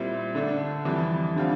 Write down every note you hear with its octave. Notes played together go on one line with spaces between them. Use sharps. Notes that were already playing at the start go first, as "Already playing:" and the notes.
Already playing: A#2 G3 C4 E4
D3 A3 D4
F2 E3 G3
D3 G3 C4 F4